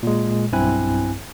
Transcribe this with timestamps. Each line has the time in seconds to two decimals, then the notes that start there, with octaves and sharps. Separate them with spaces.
0.03 A#2 G#3
0.52 B1 G2 C4 E4 G#5 F#6